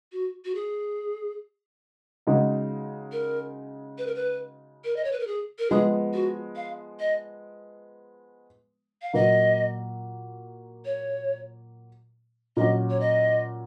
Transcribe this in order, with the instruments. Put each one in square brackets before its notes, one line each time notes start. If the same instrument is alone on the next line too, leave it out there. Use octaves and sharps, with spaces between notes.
[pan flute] F#4
F#4
G#4
[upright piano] C#3 G#3 D#4 F#4
[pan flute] A#4
B4
A#4
B4
A#4
D#5
C#5
B4
A#4
G#4
A#4
[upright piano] F3 G#3 B3 [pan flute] G#4
[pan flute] F#4
F5
D#5
F5
[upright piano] A#2 F#3 A#3 [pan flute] D#5
[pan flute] C#5
[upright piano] A#2 F#3 C#4 [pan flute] D#5
[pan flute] C#5
D#5